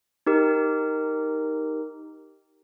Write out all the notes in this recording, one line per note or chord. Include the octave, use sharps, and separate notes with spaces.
D#4 G4 A#4